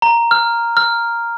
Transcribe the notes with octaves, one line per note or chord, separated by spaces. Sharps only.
A#5
F6
F6